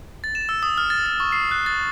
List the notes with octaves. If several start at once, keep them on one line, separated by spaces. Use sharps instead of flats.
A6
E7
E6
D#6
F6
A6
A6
C#6
C7
F#6
A6